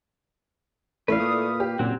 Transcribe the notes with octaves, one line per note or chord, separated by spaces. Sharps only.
A1 A3 E4 B4 D5 F5
A#2 D#6
G4
F#1 A#2 F#3 C4 F#4